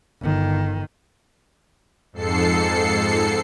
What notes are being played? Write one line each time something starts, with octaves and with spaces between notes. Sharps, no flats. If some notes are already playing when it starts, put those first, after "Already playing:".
G1 D#3
F2 G#2 A4 C7 C#7